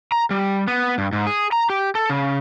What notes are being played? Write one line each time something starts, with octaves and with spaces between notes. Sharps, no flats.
A#5
G3
B3
G2
G#2
G#4
A#5
G4
A4
C#3